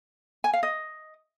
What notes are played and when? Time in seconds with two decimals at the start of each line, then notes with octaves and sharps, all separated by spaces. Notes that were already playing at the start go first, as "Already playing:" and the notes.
0.44 G#5
0.53 F5
0.63 D#5